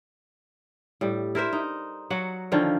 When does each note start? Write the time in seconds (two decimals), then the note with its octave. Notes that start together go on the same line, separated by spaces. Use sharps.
1.01 A2 G3
1.35 E4 A#4 C5 E5
1.53 D#4
2.10 F#3 F#4 F#5
2.52 D3 D#3 F3 C#4